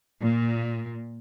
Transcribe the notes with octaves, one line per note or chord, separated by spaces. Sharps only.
A#2